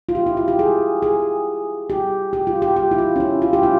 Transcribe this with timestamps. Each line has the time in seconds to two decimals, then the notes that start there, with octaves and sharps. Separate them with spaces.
0.09 F4
0.15 G4
0.26 E4
0.37 F4
0.48 G4
0.59 G#4
1.02 G#4
1.90 G4
2.33 G4
2.47 F4
2.62 G4
2.76 G4
2.91 E4
2.98 F4
3.16 C#4
3.20 E4
3.42 F4
3.53 G4
3.63 F4